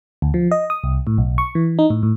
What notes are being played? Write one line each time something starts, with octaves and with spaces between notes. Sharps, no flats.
D2
F3
D#5
D#6
C2
A2
B1
C#6
E3
D#4
A2
A2